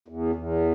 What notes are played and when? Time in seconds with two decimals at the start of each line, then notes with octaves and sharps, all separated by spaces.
0.08 E2
0.35 E2